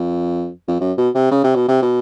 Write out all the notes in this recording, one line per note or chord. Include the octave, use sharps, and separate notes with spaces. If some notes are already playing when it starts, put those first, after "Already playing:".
Already playing: F2
F2
F#2
B2
C3
C#3
C3
B2
C3
B2